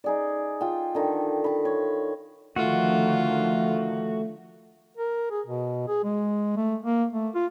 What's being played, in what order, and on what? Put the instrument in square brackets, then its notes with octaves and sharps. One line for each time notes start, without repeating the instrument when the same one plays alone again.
[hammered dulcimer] D#4 G#4 D5
F4 G5
D3 D#3
A5 B5
C#5 B5
[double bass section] D3 D#3 F3 [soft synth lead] A3 [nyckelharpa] F4 [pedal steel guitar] F#4
[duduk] A#4
G#4
B2
G#4
G#3
A3
A#3
A3
F4